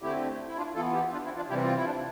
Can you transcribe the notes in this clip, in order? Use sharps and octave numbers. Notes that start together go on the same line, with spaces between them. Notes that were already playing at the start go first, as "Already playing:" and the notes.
D3 A3 C4 E4 G4
E4
D4 F4
E3 B3 F4 A4
E4 G4
D4 F4
C4 E4
D4 F4
C3 E3 G3 C4 E4 G4
F4
E4
D4